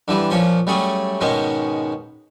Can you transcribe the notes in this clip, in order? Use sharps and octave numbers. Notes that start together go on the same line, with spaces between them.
D3 E3 G3
A#2 F3 C#4 C6
F#3 G3 A3 C#4 G#4
G#2 B2 D#3 G#3 C#4